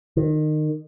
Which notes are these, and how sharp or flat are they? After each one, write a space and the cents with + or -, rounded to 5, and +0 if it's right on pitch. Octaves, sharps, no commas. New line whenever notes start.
D#3 -25